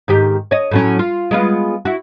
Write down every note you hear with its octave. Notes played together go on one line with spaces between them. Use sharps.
G#2 D#3 G4
C#5 D#5
A2 F#3 C#4
F4
G#3 B3 F4
E4 F#4